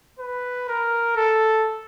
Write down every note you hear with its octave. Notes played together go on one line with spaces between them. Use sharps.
B4
A#4
A4